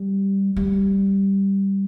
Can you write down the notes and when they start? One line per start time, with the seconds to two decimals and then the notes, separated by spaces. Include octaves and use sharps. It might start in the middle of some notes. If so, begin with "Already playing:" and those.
Already playing: G3
0.56 G3